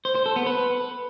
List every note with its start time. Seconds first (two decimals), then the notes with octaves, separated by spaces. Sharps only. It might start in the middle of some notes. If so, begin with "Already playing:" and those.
0.05 C5
0.15 C5
0.26 A4
0.36 B3
0.46 B4